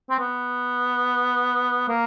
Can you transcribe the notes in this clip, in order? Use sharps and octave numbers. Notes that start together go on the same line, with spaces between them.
C4
B3
A#3